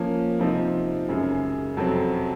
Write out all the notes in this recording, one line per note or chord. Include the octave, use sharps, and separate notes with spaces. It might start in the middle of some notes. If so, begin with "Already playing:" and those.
Already playing: F3 A#3 C#4
C3 F3 C4 D#4
F#2 C#3 G#3
F2 C3 F#3 C4